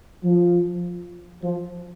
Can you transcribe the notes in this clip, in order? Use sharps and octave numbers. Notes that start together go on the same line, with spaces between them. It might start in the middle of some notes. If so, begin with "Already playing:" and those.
F3
F3